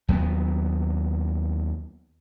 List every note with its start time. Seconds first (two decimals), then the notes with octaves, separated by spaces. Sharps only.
0.08 D#2 F#3 A#3 B3